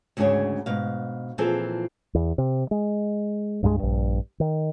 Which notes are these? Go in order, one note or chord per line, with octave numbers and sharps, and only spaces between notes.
D2 G#2 C#3 D4 G#4 C#5
G#2 B2 F5
A#2 E3 F3 C4 G#4 A4
E2
C3
G#3
C2 G2 E3 G#3
A#1 G2
D#3